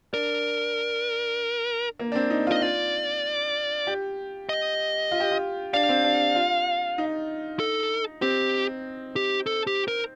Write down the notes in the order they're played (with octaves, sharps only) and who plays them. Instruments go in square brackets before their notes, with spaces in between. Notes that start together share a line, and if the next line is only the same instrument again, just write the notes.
[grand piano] D4 [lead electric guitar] A#4
[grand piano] A#3
D4
C4
D#4
[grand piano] F4 [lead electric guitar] D#5
[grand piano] F4 [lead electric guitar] D5
[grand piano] G4
[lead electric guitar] D#5
[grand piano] F4
G4
F4
[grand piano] D4 [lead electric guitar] F5
[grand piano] C4
D4
F4
D#4
[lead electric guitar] A4
[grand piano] C4 [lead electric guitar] G4
[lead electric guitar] G4
A4
G4
A#4